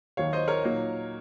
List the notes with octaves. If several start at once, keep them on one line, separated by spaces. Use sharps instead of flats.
D#2 D#3 F#3 C#5 F5
C5 D#5
A#4 C#5
A#2 F#3 A#3 D#4